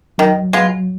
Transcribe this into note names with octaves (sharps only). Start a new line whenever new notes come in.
D#3 F#3
F#3 G#3 B3 F4